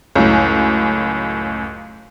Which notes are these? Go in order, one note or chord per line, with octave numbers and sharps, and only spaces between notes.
C#2 F#2 A2